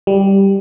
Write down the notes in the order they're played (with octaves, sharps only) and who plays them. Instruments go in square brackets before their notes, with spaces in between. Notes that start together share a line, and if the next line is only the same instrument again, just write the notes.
[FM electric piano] G3